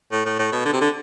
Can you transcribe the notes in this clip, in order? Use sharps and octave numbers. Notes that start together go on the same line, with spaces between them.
A2
A2
A2
B2
D3
C3
D3